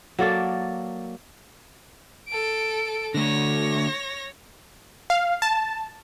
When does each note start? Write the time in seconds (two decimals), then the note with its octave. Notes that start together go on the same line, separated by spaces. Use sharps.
0.19 F#3 A#3 A4 D5
2.28 A4 D7
3.14 D3 A3 C#5 A#6
5.10 F5
5.42 A5